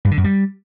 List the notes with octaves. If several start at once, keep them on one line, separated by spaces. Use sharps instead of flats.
G2
D3
F#2
G3